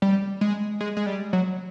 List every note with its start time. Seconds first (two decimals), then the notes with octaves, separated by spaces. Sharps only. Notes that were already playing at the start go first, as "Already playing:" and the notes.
0.02 G3
0.41 G#3
0.80 G#3
0.97 G#3
1.06 G3
1.33 F#3